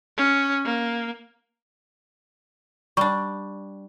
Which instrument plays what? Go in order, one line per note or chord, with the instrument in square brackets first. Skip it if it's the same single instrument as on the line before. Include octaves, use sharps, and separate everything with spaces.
[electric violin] C#4
A#3
[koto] G3 D4 [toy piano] C#6